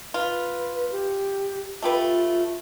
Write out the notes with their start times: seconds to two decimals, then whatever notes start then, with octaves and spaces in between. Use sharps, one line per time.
0.14 F4 B4
0.91 G4
1.83 A3 F4 G4 B4